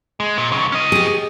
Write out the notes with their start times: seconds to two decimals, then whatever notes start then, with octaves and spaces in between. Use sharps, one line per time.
0.20 G#3
0.38 A#2
0.52 B1 C#3
0.72 C#4 D#5
0.92 G4 G#4